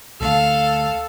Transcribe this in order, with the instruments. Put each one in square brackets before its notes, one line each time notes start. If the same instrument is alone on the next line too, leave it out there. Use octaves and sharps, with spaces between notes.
[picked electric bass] D2 D3 A3 [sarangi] A4 [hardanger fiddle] F5